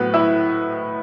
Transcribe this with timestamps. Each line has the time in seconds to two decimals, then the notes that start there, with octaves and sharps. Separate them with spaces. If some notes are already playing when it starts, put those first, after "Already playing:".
Already playing: A2 F#3 B3 B4
0.14 E4 E5